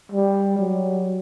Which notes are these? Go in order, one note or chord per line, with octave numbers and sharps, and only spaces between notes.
G3
F#3